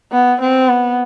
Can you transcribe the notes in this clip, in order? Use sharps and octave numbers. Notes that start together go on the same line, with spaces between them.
B3
C4
B3